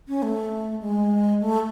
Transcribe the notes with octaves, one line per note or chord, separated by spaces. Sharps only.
C#4
A3
G#3
A3